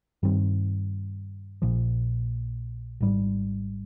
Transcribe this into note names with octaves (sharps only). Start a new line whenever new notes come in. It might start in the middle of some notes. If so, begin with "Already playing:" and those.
G2 D#3 G3 C4
A#1 A#2 F3
G#1 G#2 G3